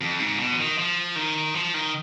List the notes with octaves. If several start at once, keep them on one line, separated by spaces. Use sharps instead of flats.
F2
G#2
B2
F3
D#3
F3
D#3
F3
D#3